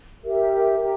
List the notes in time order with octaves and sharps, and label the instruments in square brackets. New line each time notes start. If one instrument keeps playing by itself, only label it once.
[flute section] G4 A#4 E5
G4 A#4